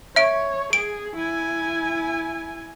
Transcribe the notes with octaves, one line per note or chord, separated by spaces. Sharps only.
C#5 E5 D7
G#4 D7
E4 G#5